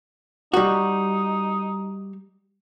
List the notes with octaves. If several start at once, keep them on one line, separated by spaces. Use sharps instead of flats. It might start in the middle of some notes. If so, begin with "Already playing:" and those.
G3 D#4 F#4